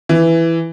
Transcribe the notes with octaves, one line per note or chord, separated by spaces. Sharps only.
E3